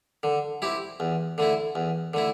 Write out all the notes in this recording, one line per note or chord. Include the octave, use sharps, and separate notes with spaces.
D3
C4 E4 G4
E2
D3 A3 E4
E2
D3 A3 E4